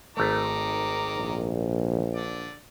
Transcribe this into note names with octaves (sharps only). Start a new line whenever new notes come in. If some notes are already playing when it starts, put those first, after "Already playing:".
G#1 D#3 A3 A#5 D6
A#1
D3 D5